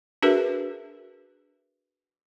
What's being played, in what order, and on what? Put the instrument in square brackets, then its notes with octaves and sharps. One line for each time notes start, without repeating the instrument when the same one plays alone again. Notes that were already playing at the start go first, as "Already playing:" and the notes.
[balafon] D4 F#4 G#4 A#4 B4 E5